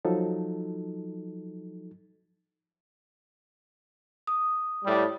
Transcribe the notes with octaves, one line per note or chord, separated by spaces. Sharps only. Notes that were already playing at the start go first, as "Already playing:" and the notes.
F3 F#3 D#4 A4
D#6
A2 G3